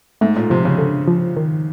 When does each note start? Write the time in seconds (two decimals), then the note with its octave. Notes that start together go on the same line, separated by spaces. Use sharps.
0.21 G#2 A3
0.36 A#2
0.50 C3 F3
0.65 C#3
0.78 D3
1.08 F3
1.37 D#3